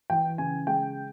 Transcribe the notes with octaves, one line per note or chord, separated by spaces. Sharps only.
E3 G5
C#3 G#5
G#3 G5